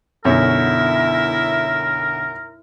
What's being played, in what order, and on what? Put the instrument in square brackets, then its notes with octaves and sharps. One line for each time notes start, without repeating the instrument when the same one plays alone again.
[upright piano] B1 B2 D3 [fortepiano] F#2 C#5 [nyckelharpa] E4 E5 [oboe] A#4